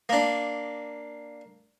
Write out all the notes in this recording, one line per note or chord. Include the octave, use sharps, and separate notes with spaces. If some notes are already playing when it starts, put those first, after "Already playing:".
A#3 D4